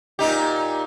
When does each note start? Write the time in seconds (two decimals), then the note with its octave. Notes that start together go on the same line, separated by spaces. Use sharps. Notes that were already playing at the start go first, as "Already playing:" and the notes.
0.19 A#2 D#4 G4